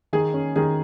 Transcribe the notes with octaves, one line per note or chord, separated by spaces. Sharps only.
D#3 G#4
C#4
D#3 G#4